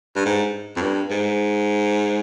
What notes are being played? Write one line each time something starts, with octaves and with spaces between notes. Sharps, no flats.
G2
G#2
F2
G2
G#2